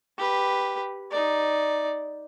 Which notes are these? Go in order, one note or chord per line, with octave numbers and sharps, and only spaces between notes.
G4 B4
D#4 D5